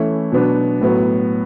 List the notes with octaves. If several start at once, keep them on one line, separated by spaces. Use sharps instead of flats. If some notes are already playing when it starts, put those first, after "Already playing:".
Already playing: E3 A3 C#4 E4
B2 F#3 B3 D4
A2 F#3 B3